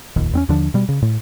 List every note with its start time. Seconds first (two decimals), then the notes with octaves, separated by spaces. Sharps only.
0.16 F1 A#1 D#2
0.33 E2 C4 C#4
0.49 D#2 D3 F3 D4
0.74 B2 G3
0.89 C#3
1.02 A2